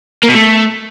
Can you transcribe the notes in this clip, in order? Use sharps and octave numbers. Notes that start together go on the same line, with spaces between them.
A#3
B2
A3